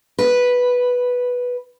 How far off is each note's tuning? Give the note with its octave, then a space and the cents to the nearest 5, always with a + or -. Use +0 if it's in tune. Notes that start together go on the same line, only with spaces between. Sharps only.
B4 -5